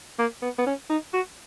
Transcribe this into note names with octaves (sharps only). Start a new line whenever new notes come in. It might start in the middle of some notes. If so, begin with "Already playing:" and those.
A#3
B3
B3
C#4
D#4
F#4